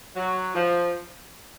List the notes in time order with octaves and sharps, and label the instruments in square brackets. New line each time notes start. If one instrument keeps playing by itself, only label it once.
[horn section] F#3
F3